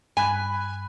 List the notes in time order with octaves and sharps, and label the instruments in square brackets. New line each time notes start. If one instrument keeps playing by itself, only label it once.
[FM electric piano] G2 B5 F#6 [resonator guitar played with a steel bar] G#5